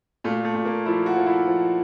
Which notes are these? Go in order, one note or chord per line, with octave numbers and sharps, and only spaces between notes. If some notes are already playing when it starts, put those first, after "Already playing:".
A#2 A3
A3
A#2
A#3
F3 E4
F#4
F3
E4
F3